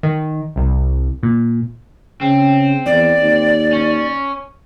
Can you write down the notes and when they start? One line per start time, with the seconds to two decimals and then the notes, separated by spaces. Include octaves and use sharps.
0.03 D#3
0.56 C2
1.23 A#2
2.21 C#3 C4
2.86 E2 D5
3.19 D#2
3.73 C#4